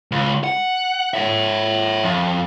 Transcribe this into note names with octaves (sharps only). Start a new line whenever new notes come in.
C#2
F#5
C#5 E5
F2